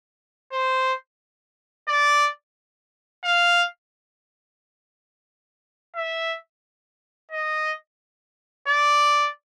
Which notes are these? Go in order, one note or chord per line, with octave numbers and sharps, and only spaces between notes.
C5
D5
F5
E5
D#5
D5